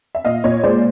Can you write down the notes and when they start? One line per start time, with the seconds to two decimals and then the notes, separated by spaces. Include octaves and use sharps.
0.15 E5
0.25 A#2 D#5 F5
0.44 A#2 C#5 D#5
0.63 G#3 C5 D5